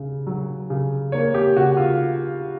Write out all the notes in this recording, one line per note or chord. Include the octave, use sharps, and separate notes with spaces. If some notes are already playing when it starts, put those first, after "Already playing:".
Already playing: C#3
F#3
C#3
A#3 C#5
G4
C#3 F#4
F4